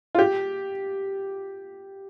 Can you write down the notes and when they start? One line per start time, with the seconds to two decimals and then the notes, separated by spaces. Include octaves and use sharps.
0.15 F4
0.19 G4